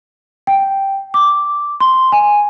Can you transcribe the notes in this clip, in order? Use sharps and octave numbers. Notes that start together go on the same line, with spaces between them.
G5
D6
C6
G#5